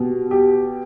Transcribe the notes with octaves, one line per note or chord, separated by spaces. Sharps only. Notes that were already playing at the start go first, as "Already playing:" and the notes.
Already playing: B2 G4
G4